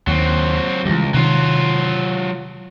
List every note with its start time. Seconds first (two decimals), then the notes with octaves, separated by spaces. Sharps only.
0.07 D#2 F#3 C4
0.86 C#2 E3 G3
1.14 C3 D#3 F#3 F4